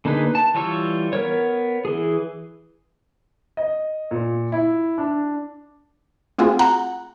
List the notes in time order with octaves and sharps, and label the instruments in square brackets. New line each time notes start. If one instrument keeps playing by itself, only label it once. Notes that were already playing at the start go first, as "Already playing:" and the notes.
[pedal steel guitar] D3 A#3 D#4 G#4 B4
A5
E3 G3 F4 C#5 E6
B3 A#4 C#5
E3 G#4
[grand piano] D#5
A#2
E4
D4
[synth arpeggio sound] A3 C4 F4 F#4 G#4
F#5 A#5 F#6